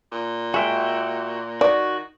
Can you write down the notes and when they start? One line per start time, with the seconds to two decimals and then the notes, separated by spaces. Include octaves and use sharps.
0.12 A#2
0.54 G#3 F#4 E5 G5
1.61 D#3 F#4 D5